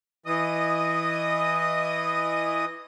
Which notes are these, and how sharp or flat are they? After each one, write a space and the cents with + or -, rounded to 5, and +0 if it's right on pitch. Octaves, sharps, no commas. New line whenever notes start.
E3 +5 D#5 -15 D#6 +0